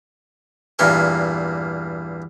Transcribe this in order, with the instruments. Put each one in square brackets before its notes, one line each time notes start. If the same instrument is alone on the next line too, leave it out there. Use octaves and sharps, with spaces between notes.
[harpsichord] E2 G2 A#2 A#3 C6 C#6